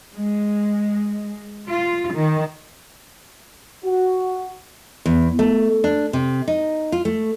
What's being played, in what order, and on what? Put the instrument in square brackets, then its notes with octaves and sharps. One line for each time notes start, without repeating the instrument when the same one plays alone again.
[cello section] G#3
F4
D#3
[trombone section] F#4
[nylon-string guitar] E2
A3
D4
C3
D#4
F4
A3